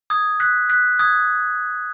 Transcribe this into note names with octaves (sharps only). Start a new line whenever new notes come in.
D#6 G#6
F#6 B6
F#6 B6
D#6 G#6